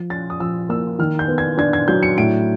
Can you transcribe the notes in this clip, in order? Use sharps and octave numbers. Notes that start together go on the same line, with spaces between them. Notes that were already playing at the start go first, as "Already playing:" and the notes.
Already playing: F3
C#4 A6
D#6
F3 E6
A#3 E6
D#3 F6
G6
B3
G#6
D4 G#6
G#6
F#3 G6
C#7
A2 D7